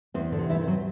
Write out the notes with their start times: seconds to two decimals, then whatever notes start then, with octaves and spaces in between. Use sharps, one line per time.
0.14 E2 C4
0.32 D3 D4
0.38 C3
0.50 E3 E4
0.62 E3
0.67 F#3 F#4